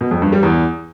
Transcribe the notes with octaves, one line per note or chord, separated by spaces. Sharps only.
B2
F2
G2
G3
E2